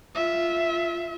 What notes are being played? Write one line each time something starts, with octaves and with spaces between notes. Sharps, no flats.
F4 E5